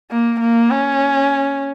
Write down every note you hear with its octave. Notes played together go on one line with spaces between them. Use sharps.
A#3
A#3
C#4